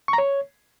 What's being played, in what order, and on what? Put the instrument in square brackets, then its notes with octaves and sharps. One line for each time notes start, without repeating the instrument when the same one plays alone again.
[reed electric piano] C#6
A#5
C#5